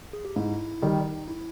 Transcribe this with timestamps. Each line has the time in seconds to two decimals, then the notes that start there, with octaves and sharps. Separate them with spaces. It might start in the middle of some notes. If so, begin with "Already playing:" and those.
0.13 G#4
0.25 G4
0.36 G#2 E4
0.82 D#3 G3 D#4
1.28 E4